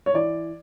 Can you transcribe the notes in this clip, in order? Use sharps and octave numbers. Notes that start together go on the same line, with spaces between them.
C#5
E3 D5